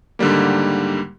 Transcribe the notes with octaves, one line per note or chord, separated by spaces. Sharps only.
G#2 D3 D#3 G3 A#3